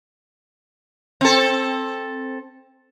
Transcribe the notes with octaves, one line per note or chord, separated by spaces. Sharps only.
C4 A4